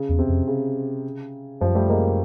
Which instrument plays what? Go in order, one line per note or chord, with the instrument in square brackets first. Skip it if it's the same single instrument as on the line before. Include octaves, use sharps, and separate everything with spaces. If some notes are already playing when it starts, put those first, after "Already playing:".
Already playing: [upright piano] C#3
[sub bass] E2
[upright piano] C3
[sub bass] F2
[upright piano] C#3
[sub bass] F#2 [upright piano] F3 G3
[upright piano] G3 A3
G#3 A#3